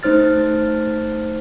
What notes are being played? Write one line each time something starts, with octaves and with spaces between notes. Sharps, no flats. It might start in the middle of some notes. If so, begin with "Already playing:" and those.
A3 D#4 C5 F6 A6